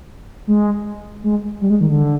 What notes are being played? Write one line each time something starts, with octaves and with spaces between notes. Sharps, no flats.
G#3
G#3
G3
G#3
D#3
D3